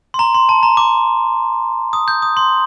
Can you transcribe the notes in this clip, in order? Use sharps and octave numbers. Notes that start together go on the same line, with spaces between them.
C6
A#5
C6
A5
A#5
D6
D#6
G6
D#6
C6